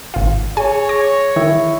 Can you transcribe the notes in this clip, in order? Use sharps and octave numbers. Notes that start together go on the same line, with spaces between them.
G#1 F4
G#4 C#5 G#5
D6 A#6
D#3 E4